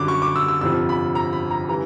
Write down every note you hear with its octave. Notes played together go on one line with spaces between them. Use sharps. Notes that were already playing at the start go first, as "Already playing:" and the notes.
Already playing: F#2 D3 G3 D6
C#6
D6
E6
E6
G1 F2 C3 F3 E6
B5
A#5
B5
A#5
C#3 E3 G3 A#5